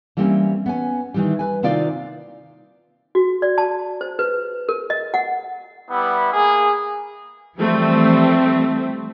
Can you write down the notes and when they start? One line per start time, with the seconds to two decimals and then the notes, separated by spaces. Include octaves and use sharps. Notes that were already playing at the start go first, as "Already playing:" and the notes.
0.17 E3 G3 A#3 C4 C#4
0.66 B3 C#4 G#5
1.14 D#3 E3 G3
1.39 B4 G#5
1.63 C3 D#3 E4 F4 D5 F5
3.15 F#4
3.42 D5
3.58 A5
4.01 C5
4.19 B4
4.69 A#4
4.90 D#5
5.14 F#5
5.90 G3 B3 E4
6.33 A#3 G#4
7.58 E3 F3 G3 A3 C4